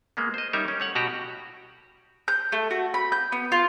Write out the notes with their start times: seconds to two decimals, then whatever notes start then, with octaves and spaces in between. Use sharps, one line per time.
0.17 G#3 A#3 B3
0.34 C5 D#5
0.53 G3 C#4 D#4 A#4 E5
0.68 C#4
0.80 A3 C#5 F#5
0.95 B2 F#4 G4 A#5
2.28 G6
2.52 A3
2.71 F#4
2.94 B5
3.12 G6
3.32 B3
3.52 F4